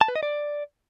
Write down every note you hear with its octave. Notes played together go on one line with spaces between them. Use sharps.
A5
B4
D#5
D5